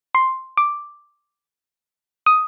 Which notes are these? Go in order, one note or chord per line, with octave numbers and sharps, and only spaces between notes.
C6
D6
D#6